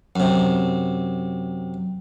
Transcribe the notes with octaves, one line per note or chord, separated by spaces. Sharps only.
F#2 C3